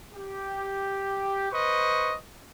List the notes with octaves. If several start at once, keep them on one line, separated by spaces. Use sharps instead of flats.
G4
B4 C5 D#5 C#6